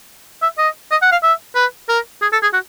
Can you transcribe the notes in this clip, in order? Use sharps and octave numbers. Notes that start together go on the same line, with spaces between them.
E5
D#5
D#5
F#5
F5
E5
B4
A#4
G#4
A4
G#4
F#4